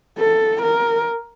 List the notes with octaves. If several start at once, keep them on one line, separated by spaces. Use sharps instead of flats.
A4
A#4